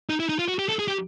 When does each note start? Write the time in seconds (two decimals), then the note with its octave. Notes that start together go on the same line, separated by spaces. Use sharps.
0.10 D#4
0.20 E4
0.29 D#4
0.39 F4
0.48 F#4
0.59 G4
0.69 A4
0.79 G#4
0.88 G4